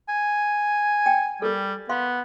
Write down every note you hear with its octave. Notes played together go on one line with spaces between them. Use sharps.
G#5
G5
G3 A4 A#4
B3 F5 C6